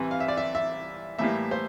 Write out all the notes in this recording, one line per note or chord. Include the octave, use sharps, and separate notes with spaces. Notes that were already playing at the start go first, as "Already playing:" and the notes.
Already playing: C2 C3 E3
F5
E5
D5
E5
E5
A2 E3 G3 A#3 E5
C5